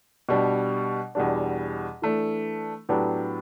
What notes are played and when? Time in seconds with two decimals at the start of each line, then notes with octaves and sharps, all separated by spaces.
0.29 B2 G3 D4
1.15 E2 B2 G3 D4
2.02 E3 A3 D4
2.89 A2 F#3 B3 D4 G4